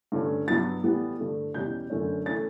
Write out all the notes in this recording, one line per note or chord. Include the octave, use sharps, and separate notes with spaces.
G2 D3 A3 C#4
G2 F#3 B3 A6
A2 E3 G3 B3
G2 D3 A3
E2 B2 G3 C#4 G6
F#2 D3 A3 C#4
E3 A3 C#4 A6